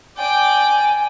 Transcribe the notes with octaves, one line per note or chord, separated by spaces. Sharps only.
D5 G5 G#5